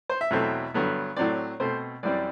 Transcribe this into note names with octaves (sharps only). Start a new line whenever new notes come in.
C5
E5
E2 B2 F#3 A3 C4
G2 D3 F#3 B3
A2 F#3 C4 D5
B2 A3 C4 C5
F#2 E3 G3 C4 D5